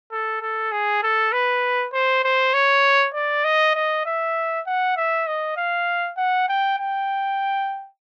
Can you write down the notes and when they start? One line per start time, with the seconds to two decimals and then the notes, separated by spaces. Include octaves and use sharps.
0.12 A4
0.41 A4
0.72 G#4
1.03 A4
1.32 B4
1.93 C5
2.24 C5
2.54 C#5
3.14 D5
3.44 D#5
3.75 D#5
4.06 E5
4.66 F#5
4.96 E5
5.27 D#5
5.57 F5
6.17 F#5
6.49 G5
6.79 G5